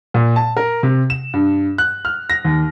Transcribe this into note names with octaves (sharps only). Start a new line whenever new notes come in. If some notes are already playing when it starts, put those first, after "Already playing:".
A#2
A5
A#4
C3
E7
G2
F#6
F6
A#6
D#2